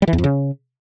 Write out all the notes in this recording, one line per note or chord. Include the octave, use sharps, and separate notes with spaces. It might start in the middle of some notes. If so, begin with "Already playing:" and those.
G3
E3
E2
F2
C#3